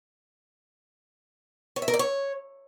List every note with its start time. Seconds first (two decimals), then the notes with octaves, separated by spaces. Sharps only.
1.76 C#5
1.82 E5
1.88 A#4
1.94 D5
1.99 C#5